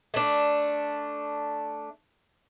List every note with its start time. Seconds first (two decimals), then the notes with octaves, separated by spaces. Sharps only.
0.14 A3 D4